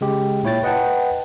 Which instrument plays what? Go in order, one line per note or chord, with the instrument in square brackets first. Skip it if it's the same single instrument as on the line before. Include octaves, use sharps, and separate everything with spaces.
[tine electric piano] C#3 G#3 G4
A#2 E4 C#5 G5 A6
B4 D#5 F#5 G5 A5